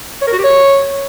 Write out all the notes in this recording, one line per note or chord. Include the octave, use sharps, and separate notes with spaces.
C#5
A#4
F#4
G4
C#5